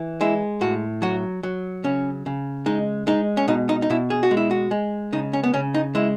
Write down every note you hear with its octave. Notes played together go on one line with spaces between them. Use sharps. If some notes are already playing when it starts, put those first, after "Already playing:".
Already playing: E3
G#3 E4
A2 F#4
F#3 F#4
F#3
C#3 C#4
C#3
G#3 D#4
G#3 D#4
C#4
B2 D#4
D#4
D#4
B2 E4
G#4
F#4
G#3
E4
F#4
G#3
C#3 D#4
C#4
B3
C#3 C#4
D#4
G#3 E4